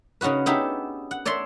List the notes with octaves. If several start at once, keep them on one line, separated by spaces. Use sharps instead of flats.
C#3 C#4 D#4 F#4 B4
B3 D4 D#4 G4 G#4 E5
F#5
C#5 D5 E5 A5 C6